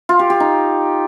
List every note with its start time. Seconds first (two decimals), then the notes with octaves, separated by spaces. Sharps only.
0.09 F4
0.19 G4
0.30 G4
0.40 D#4